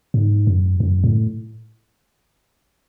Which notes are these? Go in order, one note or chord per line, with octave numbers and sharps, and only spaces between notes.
G#2
F#2
F#2
A2